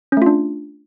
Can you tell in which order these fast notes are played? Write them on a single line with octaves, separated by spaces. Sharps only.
C#4 A3 F4 D4